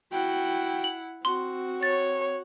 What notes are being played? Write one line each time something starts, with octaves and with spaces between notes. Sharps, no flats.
E4 F#4 F#5 G5
F#7
C4 F#4 C6
C#5 A6